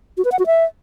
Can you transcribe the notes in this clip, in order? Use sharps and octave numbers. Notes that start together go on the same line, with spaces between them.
F#4
B4
F#5
F#4
E5